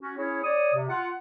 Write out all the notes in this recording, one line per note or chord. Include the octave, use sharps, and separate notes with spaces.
C#4 F#4
C#4 E4 G#4 C#5
C#5 D5 D#6
C3
F4 F#5